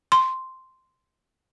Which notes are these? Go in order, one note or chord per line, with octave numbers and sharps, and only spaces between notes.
C6